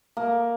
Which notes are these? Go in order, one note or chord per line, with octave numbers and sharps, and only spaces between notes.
A#3